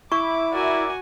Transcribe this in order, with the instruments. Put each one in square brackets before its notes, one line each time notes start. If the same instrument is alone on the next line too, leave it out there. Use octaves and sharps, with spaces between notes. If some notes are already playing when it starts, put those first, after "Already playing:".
[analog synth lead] E4 [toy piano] C#6 [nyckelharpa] D6
[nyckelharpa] F#4 G#5 [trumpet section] A#4 D5 E5